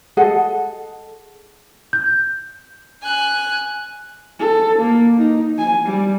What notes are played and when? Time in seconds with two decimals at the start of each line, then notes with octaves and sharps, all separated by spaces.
0.17 G#4 A4 D#5 F#5
1.93 G6
3.02 G#5 F#6
4.39 A4
4.79 A#3
5.17 D#4
5.58 G#5
5.86 G3